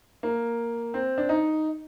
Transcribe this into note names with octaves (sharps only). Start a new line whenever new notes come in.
A#3
C4
D4
D#4